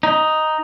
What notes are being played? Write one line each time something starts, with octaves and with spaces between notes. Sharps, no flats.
D#4